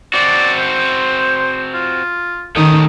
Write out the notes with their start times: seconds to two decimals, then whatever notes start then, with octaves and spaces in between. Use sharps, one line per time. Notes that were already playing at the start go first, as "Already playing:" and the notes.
0.14 C4 F#4 D5
0.57 C5
1.74 F4
2.56 D#3 A3 C#4 D#4 G4 D#6